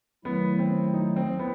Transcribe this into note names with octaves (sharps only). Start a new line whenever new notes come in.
D#3 F#3 A3 B3 E4
C4
D#4
C4
B3